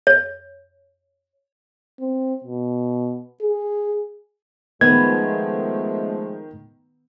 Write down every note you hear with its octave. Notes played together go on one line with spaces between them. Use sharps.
C#5
C4
B2
G#4
D#3 F3 G#3 A3 B3 G#6